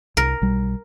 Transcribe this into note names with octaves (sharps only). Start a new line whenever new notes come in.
C2 A#4
B1 G3